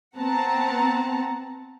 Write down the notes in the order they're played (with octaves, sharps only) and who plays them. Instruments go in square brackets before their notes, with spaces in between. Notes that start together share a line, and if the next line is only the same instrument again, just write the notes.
[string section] B3 C4 F#5 A5 A#5